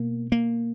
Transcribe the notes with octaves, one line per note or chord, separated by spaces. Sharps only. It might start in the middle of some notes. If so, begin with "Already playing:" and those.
Already playing: B2 A#3
A#3